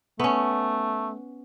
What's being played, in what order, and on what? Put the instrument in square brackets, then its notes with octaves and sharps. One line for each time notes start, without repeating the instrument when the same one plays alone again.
[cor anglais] A3 [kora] B3 C#4